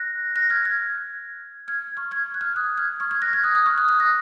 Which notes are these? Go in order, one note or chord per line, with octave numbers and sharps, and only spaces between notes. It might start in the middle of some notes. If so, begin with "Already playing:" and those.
Already playing: F#6 A#6
F#6 A#6
F6 G#6
F6 G#6
F6 G#6
C#6 F6
F6 G#6
F#6
F6 G#6
D#6 F#6
F6 G#6
C#6 F6
F6 G#6
F#6 A#6
F6 G#6
D#6 F#6
D#6 F#6
C#6 F6
D#6 F#6
D#6 F#6
A#6